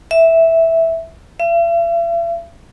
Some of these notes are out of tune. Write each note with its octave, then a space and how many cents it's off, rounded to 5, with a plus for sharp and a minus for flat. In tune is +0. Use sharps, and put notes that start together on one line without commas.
E5 -5
E5 +45